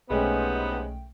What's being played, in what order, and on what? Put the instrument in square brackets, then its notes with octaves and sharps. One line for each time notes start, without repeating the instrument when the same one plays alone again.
[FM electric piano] B1 A3 G5 [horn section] C3 B3 D#4 [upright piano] G#3 C#4